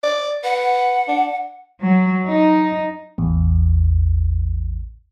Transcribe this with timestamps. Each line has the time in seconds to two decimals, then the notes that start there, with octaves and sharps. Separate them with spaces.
0.03 D5
0.44 B4 F#5
1.08 D4
1.82 F#3
2.28 D#4
3.18 A1 E2